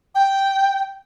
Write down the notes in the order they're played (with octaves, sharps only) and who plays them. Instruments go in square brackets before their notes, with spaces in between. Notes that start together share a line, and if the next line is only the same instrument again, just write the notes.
[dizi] G5